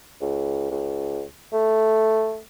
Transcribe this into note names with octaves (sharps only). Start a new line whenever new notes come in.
C#2
C#2
A3